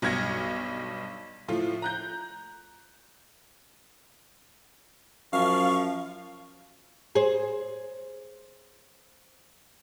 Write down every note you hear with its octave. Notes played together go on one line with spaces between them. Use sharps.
B1 G2 F6 G#6 A#6 C#7
A2 F3 A3 F4
A#5 F#6 G6
F#2 F3 F5 C#6
G#4 C5